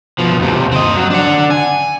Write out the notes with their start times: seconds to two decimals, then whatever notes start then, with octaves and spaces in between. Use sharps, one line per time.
0.19 B2 F3
0.39 D#2 C3
0.72 C4 D#5
0.97 F#3
1.10 D4 F#5
1.51 G#5